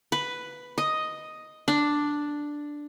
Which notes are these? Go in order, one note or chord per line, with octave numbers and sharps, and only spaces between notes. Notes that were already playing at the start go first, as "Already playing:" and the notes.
B4
D#5
D4